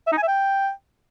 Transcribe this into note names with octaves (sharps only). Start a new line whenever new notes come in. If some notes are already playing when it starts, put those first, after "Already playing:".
E5
D#4
G#5
E5
G5